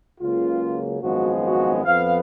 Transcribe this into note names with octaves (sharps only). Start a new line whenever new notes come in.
C#2 C#3 F#3 A#3 F4
G#1 F#2 F3 G#3 B3 F#4
F#4
F2 F3 B3 F5